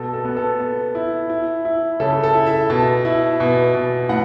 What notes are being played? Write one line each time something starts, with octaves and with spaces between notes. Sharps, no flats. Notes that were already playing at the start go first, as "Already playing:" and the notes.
Already playing: B2 A4
A4
B3
A4
B3
E4
E4
E4
C#3 A4
A4
E4
E5
B2 A5
E4
B2
B2
A2 F#5